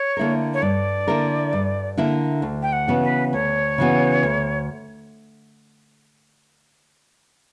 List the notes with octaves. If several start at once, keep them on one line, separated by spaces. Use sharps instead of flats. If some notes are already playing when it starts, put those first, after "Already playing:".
Already playing: C#5
D3 A#3 E4 A#4
C#5
G2 D5
D3 A#3 E4 A#4
G2
D3 A#3 E4 A#4
D2
G5
F#5
C#3 E3 B3 F#4
B4
D2 C#5
C#3 E3 B3 F#4
D2